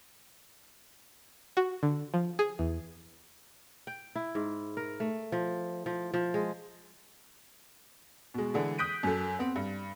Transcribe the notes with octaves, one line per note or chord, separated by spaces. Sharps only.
F#4
D3
F3
G#4
E2
G5
E4
G#2
A#4
A3
F3
F3
F3
G#3
B2 G#3
D3 E3 G#3
D#6 F#6 G6 B6 D7 D#7
F#2 A4
B3 C4
G2